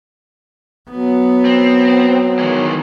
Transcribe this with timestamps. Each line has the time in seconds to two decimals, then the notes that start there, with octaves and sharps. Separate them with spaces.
0.90 F#3 B3
1.45 C4
2.39 D#3 E3 G#3